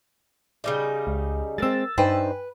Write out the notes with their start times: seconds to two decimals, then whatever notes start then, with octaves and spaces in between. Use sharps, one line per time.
0.64 C#3 G3 D#4 D5
1.07 C#2
1.58 G#3 C4 G#4 A#4 E6 A6
1.98 G2 D#4 B4 C5 G5 G#5